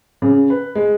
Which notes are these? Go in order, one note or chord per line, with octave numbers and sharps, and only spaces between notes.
C#3
B4
G#3